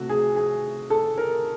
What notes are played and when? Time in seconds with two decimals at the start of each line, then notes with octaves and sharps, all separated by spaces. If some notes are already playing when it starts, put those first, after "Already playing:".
Already playing: C3 A3 F#4
0.09 G#4
0.36 G#4
0.90 A4
1.18 A#4